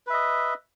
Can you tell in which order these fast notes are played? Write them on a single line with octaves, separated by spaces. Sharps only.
B4 E5 D#5